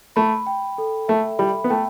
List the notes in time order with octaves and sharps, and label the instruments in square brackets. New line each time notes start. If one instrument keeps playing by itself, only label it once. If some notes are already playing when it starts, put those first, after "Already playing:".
[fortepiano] A3 [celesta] B5
[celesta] G5
A4
[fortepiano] A3 [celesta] E5
[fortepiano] G3 [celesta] B5
[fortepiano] B3
[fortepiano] A3 [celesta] G5